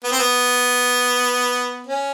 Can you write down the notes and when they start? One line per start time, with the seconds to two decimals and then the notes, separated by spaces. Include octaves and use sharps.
0.04 B3
0.12 C4
0.19 B3
1.86 C#4